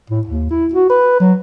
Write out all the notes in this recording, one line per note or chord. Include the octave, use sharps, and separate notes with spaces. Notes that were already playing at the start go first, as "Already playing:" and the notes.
A2
D#2
E4
F#4
B4
F#3